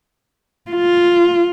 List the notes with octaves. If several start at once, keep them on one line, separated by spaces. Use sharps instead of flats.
F4